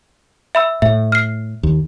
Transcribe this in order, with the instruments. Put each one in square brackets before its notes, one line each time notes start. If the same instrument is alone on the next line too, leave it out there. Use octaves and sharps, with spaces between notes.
[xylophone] E5 B5 E6
[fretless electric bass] A2 [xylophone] E5
[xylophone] F6 C7
[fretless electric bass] D#2